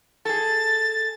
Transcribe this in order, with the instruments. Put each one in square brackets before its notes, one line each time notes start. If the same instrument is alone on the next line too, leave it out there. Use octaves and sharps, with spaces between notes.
[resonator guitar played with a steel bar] G#4 A4 [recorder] A6